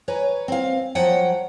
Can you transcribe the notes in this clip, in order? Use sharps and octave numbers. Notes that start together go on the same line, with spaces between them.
B4 C#5 G#5 A#5
C4 F5
F3 F#3 C#5 F#5 G5